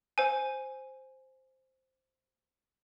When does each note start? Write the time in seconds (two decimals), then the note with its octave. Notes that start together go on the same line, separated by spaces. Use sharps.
0.18 C5 G#5